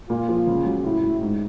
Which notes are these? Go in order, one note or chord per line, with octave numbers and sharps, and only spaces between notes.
A#2 F4
F3
C#3
F#3
A2 E4
F#3
G#2